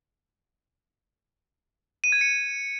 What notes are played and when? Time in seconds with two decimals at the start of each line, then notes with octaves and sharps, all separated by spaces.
2.04 D#7
2.12 G#6
2.21 C#7